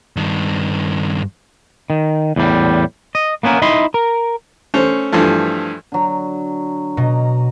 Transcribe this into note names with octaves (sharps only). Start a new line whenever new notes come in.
G2 D#3
D#3
E2 A2 G3
D#5
A#3 B3 C#4 E4 A#4
D#4 E4 D#5 B5 C6
A#4
A3 C#4 C5
G2 E3 F3 A3
D3 F#3
B2 D#5 A#5